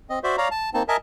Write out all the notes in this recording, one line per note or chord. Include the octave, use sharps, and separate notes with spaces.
C4 D#5
F#4 C5 D5 E5
C#5 D5 F5 A#5
A5
A#3 C4 D#4 A5
A#4 D#5 E5 G#5 A5